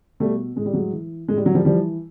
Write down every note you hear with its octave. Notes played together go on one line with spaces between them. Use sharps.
B2 G3 A3
A2 G#3
G3
F#3 G#3
E3
A2 G#3
G3
F#3
F3 G3
E3 F3 G3